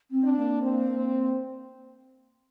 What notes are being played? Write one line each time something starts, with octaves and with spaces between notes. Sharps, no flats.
C4
D4
A#3
C4